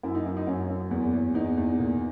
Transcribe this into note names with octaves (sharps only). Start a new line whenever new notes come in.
F#2 E4
D#4
F#2 E4
D#4
F#2 C#4
F#2
E2
E2
E2 D#4
E2
A#2